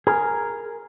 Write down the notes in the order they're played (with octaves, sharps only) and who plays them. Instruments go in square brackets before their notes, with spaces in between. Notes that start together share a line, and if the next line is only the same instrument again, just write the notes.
[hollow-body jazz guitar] G#4 [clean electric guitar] A#4